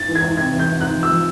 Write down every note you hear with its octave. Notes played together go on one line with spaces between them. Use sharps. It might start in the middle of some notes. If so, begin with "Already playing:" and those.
Already playing: G#2 A6
E3
G#6
G#2
C3 G#6
E2
G6
C3
G#2 F#6
F3
E6
F3